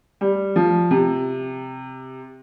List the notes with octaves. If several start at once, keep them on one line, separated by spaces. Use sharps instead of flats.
G3
F3
C3